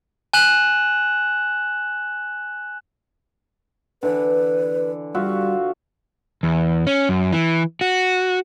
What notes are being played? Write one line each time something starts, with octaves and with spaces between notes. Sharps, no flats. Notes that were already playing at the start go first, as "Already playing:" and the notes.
G#5 F#6 E7 F#7
D3 E3 B4
G3 F4 F#4 E5
E2
C#4
F#2
E3
F#4